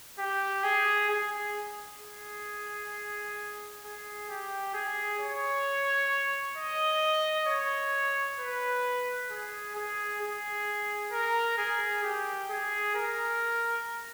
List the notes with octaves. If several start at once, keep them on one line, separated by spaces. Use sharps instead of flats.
G4
G#4
G#4
G#4
G#4
G4
G#4
C#5
D#5
C#5
B4
G#4
G#4
G#4
A#4
G#4
G4
G#4
A#4